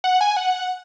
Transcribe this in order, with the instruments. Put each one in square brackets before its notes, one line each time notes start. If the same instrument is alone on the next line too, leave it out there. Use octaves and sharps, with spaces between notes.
[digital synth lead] F#5
G#5
F#5